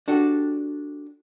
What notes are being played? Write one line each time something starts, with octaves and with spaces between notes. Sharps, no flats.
D4 F#4 G4 A4